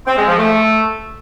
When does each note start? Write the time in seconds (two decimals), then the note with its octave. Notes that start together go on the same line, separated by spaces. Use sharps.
0.06 C4
0.17 G#3
0.28 F3
0.38 A3